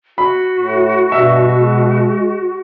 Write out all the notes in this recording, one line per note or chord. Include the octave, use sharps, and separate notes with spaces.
F#4 B5
A2
G2 B2 E5
G#3